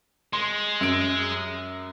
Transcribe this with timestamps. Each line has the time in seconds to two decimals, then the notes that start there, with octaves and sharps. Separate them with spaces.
0.33 G#3 C6
0.81 F#2 D7